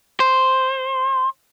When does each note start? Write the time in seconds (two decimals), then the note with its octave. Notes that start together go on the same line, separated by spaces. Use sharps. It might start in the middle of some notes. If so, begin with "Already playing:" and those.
0.20 C5